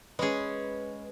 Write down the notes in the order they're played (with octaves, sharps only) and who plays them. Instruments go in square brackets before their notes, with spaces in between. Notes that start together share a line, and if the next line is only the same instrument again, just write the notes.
[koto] G#3 C#4 G#4 [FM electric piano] B4